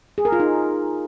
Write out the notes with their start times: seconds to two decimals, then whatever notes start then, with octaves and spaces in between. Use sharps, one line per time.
0.18 G#4
0.25 A#4
0.32 F4
0.40 D#4